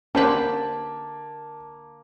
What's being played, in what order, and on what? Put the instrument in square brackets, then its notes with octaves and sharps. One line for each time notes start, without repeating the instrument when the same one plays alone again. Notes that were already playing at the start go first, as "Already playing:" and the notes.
[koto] D3 G4 B4 [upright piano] A#3 [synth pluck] C#4 C5 D5 [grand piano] A5